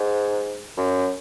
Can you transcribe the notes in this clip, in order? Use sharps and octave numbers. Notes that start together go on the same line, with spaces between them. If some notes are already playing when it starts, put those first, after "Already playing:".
Already playing: G#2
F#2